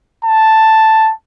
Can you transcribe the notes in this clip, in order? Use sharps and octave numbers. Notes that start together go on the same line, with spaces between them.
A5